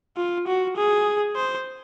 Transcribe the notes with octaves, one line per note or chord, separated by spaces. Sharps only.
F4
F#4
G#4
C5